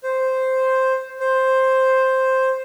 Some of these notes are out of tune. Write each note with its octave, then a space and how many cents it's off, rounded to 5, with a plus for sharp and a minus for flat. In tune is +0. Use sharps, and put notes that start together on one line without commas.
C5 +0
C5 +5